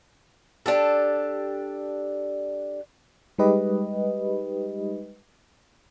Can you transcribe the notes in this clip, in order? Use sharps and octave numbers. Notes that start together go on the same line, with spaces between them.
D4 G4 A4
G3 G#3 D#4 G4 B4 D#5